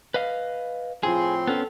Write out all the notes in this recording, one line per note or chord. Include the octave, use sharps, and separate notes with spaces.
B4 D#5 F5
A2 F3 C4 F4 G#4 C6
B3 C#4 A4